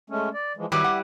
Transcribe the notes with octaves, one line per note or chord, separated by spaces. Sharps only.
G#3 A3 C#4
D5
E3 F3 G#3
D#3 F#3 G3 E4 B4 D6
F#5